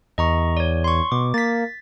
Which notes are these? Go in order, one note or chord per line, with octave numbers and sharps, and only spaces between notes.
E2 D#5 A#5 C#6
C#5 D5
C6 C#6
B2 D6
A#3 A6 B6